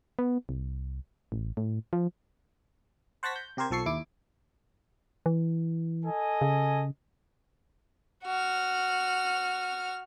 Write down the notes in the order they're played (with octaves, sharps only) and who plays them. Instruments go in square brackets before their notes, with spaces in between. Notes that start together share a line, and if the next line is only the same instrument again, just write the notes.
[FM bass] B3
C2
A1
A2
F3
[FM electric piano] C5 F#5 A5 C#6 A#6 B6
G6
C3 G4 A#4 C5 G#6
B1 F3 A4 C#6 C7
D#2 E4 D6
[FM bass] E3
[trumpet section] A4 D#5 G#5
[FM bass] C#3
[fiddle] F#4 F6